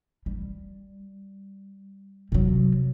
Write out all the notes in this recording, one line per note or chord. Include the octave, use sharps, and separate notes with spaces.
G3
C3 F#3